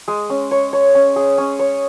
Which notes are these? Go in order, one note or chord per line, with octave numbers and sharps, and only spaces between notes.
G#3
C#4
C#5
C#5
C#4
G#4
C#4
C#5